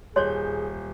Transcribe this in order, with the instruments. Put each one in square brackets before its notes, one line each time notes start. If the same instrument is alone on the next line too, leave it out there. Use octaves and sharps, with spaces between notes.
[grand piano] D#1 G6 [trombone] G#4 [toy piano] C#5 D#5 C6